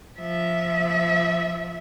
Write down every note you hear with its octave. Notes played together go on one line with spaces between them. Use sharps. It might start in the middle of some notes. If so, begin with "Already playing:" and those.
F3 E5